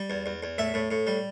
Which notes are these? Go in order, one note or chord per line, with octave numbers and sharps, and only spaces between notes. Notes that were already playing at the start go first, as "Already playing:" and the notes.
Already playing: G3
E2
E2
E2
A2 E5
A2
A2
G3